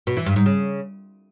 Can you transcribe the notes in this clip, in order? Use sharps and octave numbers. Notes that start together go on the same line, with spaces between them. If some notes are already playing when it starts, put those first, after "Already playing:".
B2
E3
G2
G#2
C#3